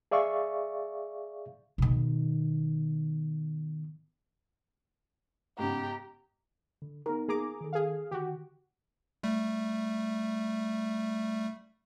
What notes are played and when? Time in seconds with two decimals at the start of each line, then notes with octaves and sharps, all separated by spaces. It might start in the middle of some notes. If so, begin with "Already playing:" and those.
0.11 G#4 D5 E5 F5 C#6
1.78 B2 D#3
5.58 G#2 C#3 B3 G4 A#5
6.82 D3
7.06 B3 D#4 A#4
7.29 A#3 G#4 A#5 D6
7.61 D#3 A4
7.73 G#4 F5
8.11 D3 D#3 F#4 G4
9.23 G3 A3